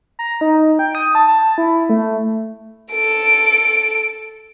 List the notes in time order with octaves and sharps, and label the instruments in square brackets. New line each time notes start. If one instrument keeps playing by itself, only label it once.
[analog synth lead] A#5
D#4
G5
D#6
A5
A5
E4
A3
[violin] A4 D7